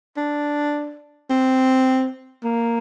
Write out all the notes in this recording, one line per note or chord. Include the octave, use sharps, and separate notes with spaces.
D4
C4
A#3